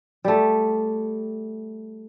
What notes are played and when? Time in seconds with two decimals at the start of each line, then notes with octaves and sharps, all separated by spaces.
0.25 G3 A3